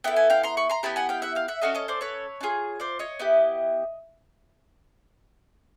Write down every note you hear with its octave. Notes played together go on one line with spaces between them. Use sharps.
B3 E4 A4 G5
G#5
F5 G5
A#5 C6
B5 C#6
A#5 C6
B3 E4 G4 A5 B5
F#5 G#5
F5 G5
E5 F#5
F5 G5
E5 F#5
C#4 F#4 A4 D#5 F5
C#5 D#5
C5 D5
B4 C#5
D4 F4 G#4
C5 D5
C#5 D#5
B3 E4 G4